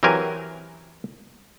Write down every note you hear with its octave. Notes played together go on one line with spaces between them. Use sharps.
E3 F#3 C4 G4 A#4 G#5